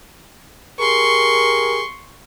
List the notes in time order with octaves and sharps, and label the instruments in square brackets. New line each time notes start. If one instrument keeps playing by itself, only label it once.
[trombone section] G4 G#4 A#4 [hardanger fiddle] C6 C#6